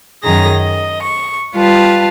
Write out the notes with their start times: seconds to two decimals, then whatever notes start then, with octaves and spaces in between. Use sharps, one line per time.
0.23 F#2 D#3 G#4 A#5 A#6
0.55 D#5
1.01 C#6
1.54 G3 F4 B4 F5 A5